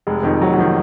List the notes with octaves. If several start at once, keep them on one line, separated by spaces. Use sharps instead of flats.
F1 G#3
F2 D#3
F1 F#3
F#3
D#3 F3